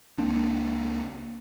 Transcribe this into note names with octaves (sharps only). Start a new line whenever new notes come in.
C#2 A#3 C4 D4